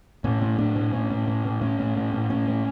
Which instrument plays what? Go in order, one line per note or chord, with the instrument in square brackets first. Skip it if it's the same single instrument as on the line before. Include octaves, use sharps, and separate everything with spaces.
[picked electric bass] A2 C#4
A2
A2 D4
A2
A2 C#4
A2
A2
A2
A2 C#4
A2
A2
A2
A2 C#4
A2